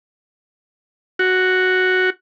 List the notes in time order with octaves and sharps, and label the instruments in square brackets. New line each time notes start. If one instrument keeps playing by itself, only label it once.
[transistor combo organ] F#4